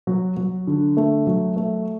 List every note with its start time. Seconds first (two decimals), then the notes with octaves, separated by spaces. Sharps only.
0.07 F#3
0.37 F#3
0.67 D3
0.97 A3
1.27 F#3
1.56 A3